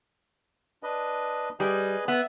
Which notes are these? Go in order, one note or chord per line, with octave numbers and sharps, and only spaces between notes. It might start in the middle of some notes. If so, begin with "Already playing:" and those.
D4 B4 D#5
G3 G#4 B4 D#5
B3 E5